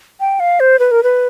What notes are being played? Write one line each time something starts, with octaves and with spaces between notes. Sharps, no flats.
G5
F5
C5
B4
A#4
B4